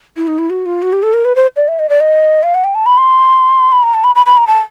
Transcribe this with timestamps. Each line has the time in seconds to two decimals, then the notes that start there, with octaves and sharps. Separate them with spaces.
0.17 E4
0.28 D#4
0.39 E4
0.50 F#4
0.66 F4
0.82 F#4
0.93 G4
1.03 A4
1.13 A#4
1.25 B4
1.36 C5
1.56 D5
1.68 E5
1.79 D#5
1.89 D5
2.00 D#5
2.43 F5
2.55 F#5
2.64 G5
2.75 A5
2.86 B5
2.98 C6
3.72 B5
3.83 A#5
3.94 A5
4.04 B5
4.15 B5
4.26 B5
4.37 A#5
4.47 A5